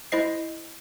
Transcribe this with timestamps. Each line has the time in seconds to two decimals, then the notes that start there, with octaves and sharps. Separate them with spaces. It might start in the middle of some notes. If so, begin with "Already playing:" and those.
0.12 E4 C5 D#5 C7